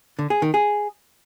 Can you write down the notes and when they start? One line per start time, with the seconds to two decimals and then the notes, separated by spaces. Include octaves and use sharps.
0.19 D3
0.30 G#4
0.42 D#3
0.54 G#4